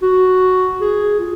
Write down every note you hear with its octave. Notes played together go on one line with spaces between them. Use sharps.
F#4
G#4
F4